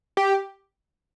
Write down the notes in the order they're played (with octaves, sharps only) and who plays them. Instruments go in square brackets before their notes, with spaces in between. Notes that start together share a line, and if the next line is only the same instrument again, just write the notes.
[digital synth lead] G4